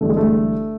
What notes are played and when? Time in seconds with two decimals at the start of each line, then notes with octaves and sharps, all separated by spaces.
0.01 G1 G2 E3 A3
0.09 G#3
0.17 A3